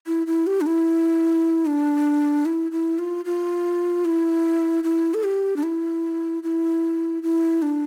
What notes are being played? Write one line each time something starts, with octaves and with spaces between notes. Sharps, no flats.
E4
E4
G4
D4
E4
D4
E4
E4
F4
F4
E4
E4
A4
G4
D4
E4
E4
E4
D4